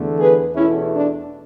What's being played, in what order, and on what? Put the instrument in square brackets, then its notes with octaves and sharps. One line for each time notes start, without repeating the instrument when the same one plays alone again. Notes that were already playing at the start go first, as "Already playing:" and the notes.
Already playing: [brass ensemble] E2 D3 A3
G#4 B4
E2 B2 A3 C#4 E4
D4